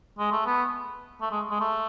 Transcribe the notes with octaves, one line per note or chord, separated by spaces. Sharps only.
G#3
A3
B3
A3
G#3
G#3
A3